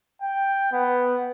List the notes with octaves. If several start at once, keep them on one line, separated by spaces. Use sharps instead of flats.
G5
B3